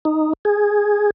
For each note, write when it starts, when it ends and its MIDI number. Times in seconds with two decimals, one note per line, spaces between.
0.05 0.33 63
0.45 1.10 68